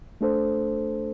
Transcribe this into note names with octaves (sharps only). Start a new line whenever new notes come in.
A3 D4 A4 C5